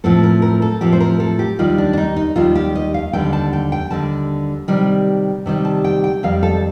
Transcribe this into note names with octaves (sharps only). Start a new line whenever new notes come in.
A2 F3 C4 A4
A#4
A#4
A4
A2 F3 C4 G4
C5
A#4
A4
G4
D#2 D#3 G3 F4
D4
D4
D#4
D#4
D#2 D#3 G3 F4
G4
D#5
F5
D#2 D3 G3 G5
A5
G5
G5
D#2 D3 G3 A5
C3 D#3 G3
C3 D#3 G3
A5
G5
G5
F2 D#3 G3 F5
A4